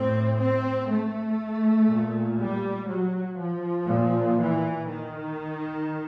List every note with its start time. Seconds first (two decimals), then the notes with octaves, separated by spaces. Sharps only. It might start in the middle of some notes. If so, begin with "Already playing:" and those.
Already playing: A2 C4
0.38 C4
0.87 A3
1.87 A#2
2.38 G3
2.88 F#3
3.37 F3
3.88 A#2
4.38 E3
4.87 D#3